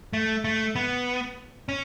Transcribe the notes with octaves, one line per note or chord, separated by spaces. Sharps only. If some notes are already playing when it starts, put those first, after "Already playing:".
A3
A3
B3
C#4